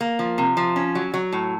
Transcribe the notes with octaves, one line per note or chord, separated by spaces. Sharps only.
A#3
F3
C3
F3
C#4
F#3
F#3
A2